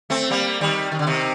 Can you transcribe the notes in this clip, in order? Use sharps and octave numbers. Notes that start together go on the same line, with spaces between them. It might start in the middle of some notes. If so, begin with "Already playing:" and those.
A3 C4
G3 A#3
D#3 G3
D#3
D3
C3 D#3